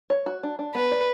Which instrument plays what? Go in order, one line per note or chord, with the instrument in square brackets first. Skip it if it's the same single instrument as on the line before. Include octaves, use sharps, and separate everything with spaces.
[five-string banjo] C#5
F#4
D4
D4
[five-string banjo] B3 [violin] B4
[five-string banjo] D5